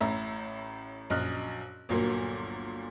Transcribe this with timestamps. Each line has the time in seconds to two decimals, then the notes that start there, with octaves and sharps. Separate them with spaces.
0.01 A1 A2 E5 A#5
1.10 A#1 F#2 D#5 F6 F#6
1.89 G1 D2 A#2 F#3 A#3